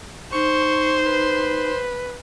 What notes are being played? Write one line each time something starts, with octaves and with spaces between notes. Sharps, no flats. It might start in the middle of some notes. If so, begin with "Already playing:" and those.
D#4 C5 C#6
B4